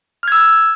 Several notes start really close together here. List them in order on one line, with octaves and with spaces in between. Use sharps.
F6 G#6 E6